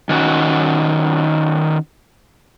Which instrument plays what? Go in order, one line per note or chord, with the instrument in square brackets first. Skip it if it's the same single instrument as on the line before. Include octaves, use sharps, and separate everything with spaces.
[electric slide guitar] D#3 C#4 F#4